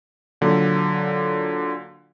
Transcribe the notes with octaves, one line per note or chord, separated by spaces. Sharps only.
A#2 D3 F#3